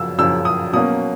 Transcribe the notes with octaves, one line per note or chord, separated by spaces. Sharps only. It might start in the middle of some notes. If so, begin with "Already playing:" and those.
Already playing: F#2 C#3 F3 E6
F#2 C#3 F3 E6
D#6
B2 F#3 A#3 C#4 D#6